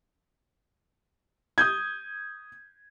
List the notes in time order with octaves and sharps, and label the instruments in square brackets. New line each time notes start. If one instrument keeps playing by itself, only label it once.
[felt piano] D#6 G6 G#6